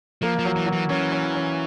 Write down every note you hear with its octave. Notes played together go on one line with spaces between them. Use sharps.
F3 A#3
F3
F#3
E3
F#3
E3
E3 C#4
C#4
C#4